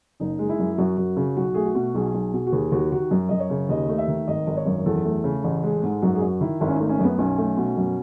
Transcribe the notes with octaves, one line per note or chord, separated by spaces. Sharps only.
F#1 D#4
G#3
E4
F#2
F#2 F#4
F#2
C#3
B1 F#4
A3 G#4
F#4
B2
B1 G#4
B1
B2
F#4
D#2 G#4
D#2 F#4
D#3 F#4
F#2
F#2 D#5
C#5
C#3
D#2 D#5
A3
E5
D#3
G#1 D#5
G#1
C#5
F#2
E2 A4
A3
C#3
A1
G#3
G#2
F#2 F#4
G#4
F#2 F#4
D#3 E4
G#1 E4
C#4
A3 D#4
C#4
F#2
B3
B1 C#4
A3
B2
F#2